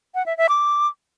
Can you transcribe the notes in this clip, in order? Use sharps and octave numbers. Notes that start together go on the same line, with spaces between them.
F#5
E5
E5
D6